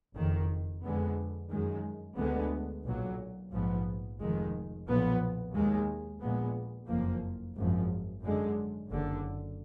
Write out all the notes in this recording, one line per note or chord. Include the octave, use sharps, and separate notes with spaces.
F#1 F2 D#3
F2 D3 G#3 B3
F#2 D#3 G#3
D2 D3 G#3 B3
B1 A#2 F#3
A#1 G#2 F3 B3
F1 F2 D#3 G#3
B1 A#2 F3 B3
D#2 D#3 G#3
A#1 A#2 G#3 B3
F#1 F2 F3 A#3
G#1 F#2 F3
F#2 D3 G#3
F#1 F#2 D3